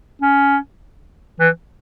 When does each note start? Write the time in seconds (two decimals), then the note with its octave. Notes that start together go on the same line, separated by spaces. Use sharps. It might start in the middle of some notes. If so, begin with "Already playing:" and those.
0.22 C#4
1.40 E3